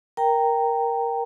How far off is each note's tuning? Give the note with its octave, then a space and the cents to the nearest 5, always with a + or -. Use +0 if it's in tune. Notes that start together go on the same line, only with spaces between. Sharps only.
A#4 +5 G5 +0 A#5 -10